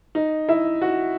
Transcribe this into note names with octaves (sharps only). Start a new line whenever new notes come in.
D#4
E4
F#4